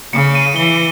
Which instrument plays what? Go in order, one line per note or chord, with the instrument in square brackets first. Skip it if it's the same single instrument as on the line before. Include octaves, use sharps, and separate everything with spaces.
[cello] C#3 [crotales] C#7
[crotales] D#7
[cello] E3 [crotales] G7